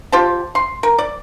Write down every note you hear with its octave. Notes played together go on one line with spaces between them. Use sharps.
F4 G4 C5 A5
C6
A#4
D5